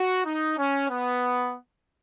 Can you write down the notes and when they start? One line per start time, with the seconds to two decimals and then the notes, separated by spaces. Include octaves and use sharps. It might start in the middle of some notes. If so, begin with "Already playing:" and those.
Already playing: F#4
0.25 D#4
0.57 C#4
0.89 B3